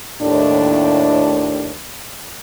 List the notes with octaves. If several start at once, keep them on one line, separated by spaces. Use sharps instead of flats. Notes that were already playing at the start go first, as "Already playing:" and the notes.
D#2 A2 D4